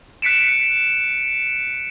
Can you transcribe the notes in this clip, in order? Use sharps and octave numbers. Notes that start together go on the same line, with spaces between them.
F#6 B6 C#7 D7 E7